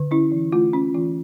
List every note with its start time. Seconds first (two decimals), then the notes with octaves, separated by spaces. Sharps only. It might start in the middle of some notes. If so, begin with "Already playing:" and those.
Already playing: D3
0.11 C#4 E4
0.32 E3
0.52 A3 F4
0.73 C#4
0.95 E3 F4